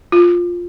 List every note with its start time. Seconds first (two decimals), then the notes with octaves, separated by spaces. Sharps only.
0.12 F4